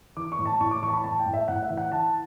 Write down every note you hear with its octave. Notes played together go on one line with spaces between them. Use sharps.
E3 D6
C#6
A2
A5
A2 C#6
D6
E3 C#6
A5
B5
A2 A5
G5
A2
E5
A2 F#5
E5
E3
F#5
E3 A5